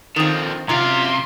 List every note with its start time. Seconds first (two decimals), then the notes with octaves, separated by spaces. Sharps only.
0.16 D3 D#3 F3 C4
0.69 F#2 C3 F4 F5 A#5